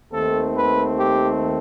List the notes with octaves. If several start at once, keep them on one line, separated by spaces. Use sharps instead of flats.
D#2 D#3 A3 C4 A4
B4
G4